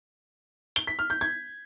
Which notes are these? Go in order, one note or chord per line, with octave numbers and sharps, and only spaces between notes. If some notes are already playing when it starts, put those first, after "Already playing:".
G7
B6
F6
G6
G#6